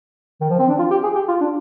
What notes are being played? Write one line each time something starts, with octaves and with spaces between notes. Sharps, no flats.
D#3
F3
C4
D4
F4
G4
G#4
G4
F4
D4